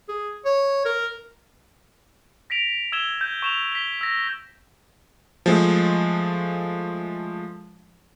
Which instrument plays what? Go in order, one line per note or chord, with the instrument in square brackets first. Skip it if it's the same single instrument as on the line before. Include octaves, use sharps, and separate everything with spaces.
[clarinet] G#4
C#5
A#4
[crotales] A#6 B6 D7 F7
E6 G#6 E7 G7
G6
C#6 E7 F7
B6 G7
E6 A#6
[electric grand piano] F3 G#3 A3